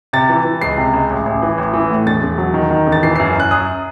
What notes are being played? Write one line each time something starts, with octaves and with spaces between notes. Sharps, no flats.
C3 A6
E3
E3
C#2 C7
C3
C#2
A1
A1
E3
A1
E3
A2
E1 A6
E1
F#3
D#3
D#3
E1
A6
E3 C7
C7
F#2
F#2 F#6
F#2 D#6